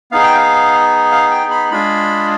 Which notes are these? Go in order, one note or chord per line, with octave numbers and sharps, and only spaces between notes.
B3 D#4 G#4 F5
G5
F5
F5
G5
B5
G#3 D4 F4 G#4 B5